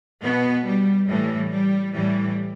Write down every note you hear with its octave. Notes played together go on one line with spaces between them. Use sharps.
B2 B3
G3
A2 E3 G3
G3
A2 E3 G3